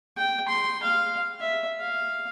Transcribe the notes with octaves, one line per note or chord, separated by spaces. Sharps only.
G5
C6
F5
E5
F5